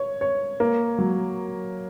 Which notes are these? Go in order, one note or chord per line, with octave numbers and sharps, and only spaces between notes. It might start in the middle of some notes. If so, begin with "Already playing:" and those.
Already playing: C#5
C#5
A#3
F#3